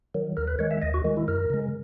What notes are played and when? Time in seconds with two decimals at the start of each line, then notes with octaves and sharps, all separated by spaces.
0.15 D#3 F#3
0.37 D#2 A#4
0.48 B4
0.59 D#3 G#3 C#5
0.71 E5
0.82 D#2 D#5
0.94 F#4
1.04 D#3 G#3
1.17 E4
1.28 F#2 A#4
1.50 C#3 G#3